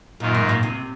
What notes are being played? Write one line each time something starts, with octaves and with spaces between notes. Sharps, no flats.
F#2 A#2 D#3 A#3 F4
G#2
A#2
C3